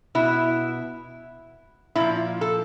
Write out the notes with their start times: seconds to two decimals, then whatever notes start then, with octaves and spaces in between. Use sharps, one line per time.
0.15 B2 E4
1.95 A#2 F3 E4
2.41 A4